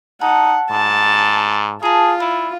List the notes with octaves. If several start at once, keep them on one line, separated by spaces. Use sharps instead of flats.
D#4 A4 F#5
G#2 A5
F4 G#4 A5 A#5
E4 D5